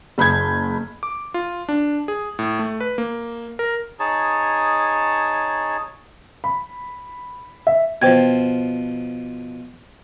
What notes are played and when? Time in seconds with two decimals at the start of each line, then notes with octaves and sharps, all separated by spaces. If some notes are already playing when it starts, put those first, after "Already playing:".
0.18 F#1 B5 G6 G#6
1.03 D6
1.34 F4
1.69 D4
2.08 G#4
2.39 A2
2.59 A3
2.80 B4
2.98 A#3
3.59 A#4
4.00 D#4 G#4 C#5 A5
6.44 B5
7.67 E5
8.02 B2 F3 C5 G5 G#6